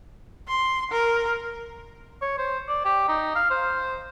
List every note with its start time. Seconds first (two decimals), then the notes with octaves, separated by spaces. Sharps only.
0.48 C6
0.91 A#4
2.21 C#5
2.38 C5
2.68 D5
2.85 G4
3.08 D#4
3.35 F5
3.50 C5